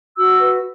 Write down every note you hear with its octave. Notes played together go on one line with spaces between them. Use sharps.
F#4 E6
B4